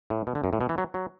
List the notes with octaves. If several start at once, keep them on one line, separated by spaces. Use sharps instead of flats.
A2
B2
D3
F#2
A2
B2
E3
F#3
F#3